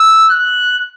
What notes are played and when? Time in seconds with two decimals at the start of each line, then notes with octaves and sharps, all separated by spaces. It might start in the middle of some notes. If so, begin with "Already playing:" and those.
Already playing: E6
0.31 F#6